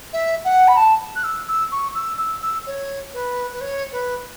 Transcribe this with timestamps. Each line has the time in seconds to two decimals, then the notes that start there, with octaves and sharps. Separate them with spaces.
0.13 E5
0.44 F#5
0.68 B5
0.76 A5
1.15 F#6
1.24 E6
1.48 E6
1.72 C#6
1.95 E6
2.18 E6
2.42 E6
2.66 C#5
3.13 B4
3.52 B4
3.61 C#5
3.92 B4